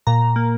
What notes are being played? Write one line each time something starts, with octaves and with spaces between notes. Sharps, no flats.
A#2 A#5
A#2
A#3